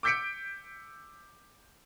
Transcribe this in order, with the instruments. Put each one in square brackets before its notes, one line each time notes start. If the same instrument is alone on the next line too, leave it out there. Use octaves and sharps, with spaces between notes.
[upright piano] D6 E6 G6 B6 C#7 D7